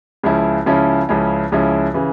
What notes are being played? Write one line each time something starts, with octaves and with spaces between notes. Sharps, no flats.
C#2 C#3 F3 C#4 E4
C#2 C#3 F3 C#4 E4
C#2 C#3 F3 C#4 E4
C#2 C#3 F3 C#4 E4
C#3 E3